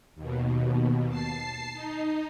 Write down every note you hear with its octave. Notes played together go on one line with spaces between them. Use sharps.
D#2 B2
A5 C7
D#4